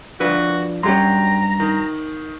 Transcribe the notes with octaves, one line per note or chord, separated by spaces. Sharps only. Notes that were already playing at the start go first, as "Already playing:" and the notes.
F3 D4 F#4 B4
G2 F#3 C#4 G4 A#5 C6
D#3